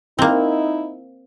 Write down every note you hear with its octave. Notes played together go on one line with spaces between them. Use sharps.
A#3 C4 D#4 E4